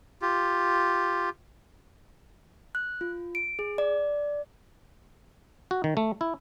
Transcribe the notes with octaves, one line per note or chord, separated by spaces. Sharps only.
F4 G4
F#6
F4
D7
G#4
D5
F#4
D#3
A3
E4